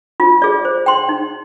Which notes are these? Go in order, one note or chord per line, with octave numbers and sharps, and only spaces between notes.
F4
G#4 D5
C5
G5 C6
D#4